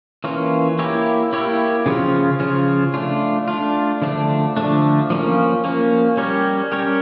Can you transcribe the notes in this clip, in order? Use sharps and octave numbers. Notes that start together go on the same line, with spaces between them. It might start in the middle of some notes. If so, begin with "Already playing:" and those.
E3 A#3 C#4 F4
A#3 E4 G4 C#5
A#3 E4 G4 C#5
C#3 F3 C#4 F4
C#3 F3 C#4 F4
A3 D4 F4
A3 D4 F4
D3 F3 A3 D4
D3 F3 A3 D4
F3 A#3 C#4
F3 A#3 C#4
G3 C#4 G4 A#4 C#5
G3 C#4 G4 A#4 C#5